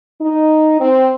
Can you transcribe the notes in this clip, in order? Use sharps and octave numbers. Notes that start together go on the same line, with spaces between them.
D#4
C4